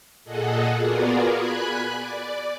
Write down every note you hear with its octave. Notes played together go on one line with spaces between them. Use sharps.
A#2 G#4 A4 D#5 F#5
B3 F4 F#4 G#4 A#4 D5
G#5 B5 F#6
D5